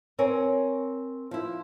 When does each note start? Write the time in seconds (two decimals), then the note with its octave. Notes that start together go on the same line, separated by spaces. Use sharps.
0.19 C4 A#4 C#5 G#5
1.31 F3 E4